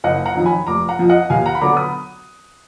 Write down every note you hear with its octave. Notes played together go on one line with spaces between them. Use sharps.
F#1 D#5 F#5
F#5 A#5
F2 D#3 F#3
G#5 B5
F1 A#5 D6
F#5 A#5
F2 F3
D#5 F#5
D#2 F5 G#5
F#5 A#5
B5
D3 F#3 B3 A#5 D6
B5 D#6